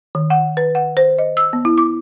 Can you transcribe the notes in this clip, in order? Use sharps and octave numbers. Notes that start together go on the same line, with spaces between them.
D#3
F#5
B4
F#5
C5
D#5
E6
B3
E4
D6